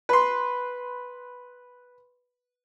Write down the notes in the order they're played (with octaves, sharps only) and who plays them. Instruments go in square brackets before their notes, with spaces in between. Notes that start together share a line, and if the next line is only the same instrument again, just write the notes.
[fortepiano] B4 C6